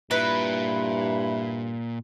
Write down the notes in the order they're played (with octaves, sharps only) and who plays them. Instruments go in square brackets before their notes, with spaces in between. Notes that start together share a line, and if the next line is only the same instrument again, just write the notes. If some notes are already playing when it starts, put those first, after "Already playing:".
[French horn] G2 [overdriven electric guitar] A#2 [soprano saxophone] E4 [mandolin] B4